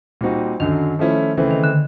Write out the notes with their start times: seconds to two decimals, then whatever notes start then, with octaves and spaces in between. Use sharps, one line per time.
0.21 A#2 G3 C4 D#4 F#4
0.60 F#2 D3 D#3 F#3
0.99 F3 A3 C#4 E4
1.37 C#3 E3 A3 C4
1.51 D#3
1.64 D3